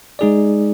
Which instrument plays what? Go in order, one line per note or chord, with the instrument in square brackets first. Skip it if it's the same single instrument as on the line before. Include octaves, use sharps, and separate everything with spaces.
[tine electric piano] G#3 D#4 G#4 D5